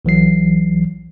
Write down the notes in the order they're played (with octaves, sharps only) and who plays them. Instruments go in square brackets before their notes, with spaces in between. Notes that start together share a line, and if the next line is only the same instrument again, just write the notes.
[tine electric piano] B1 E3 F#3 C7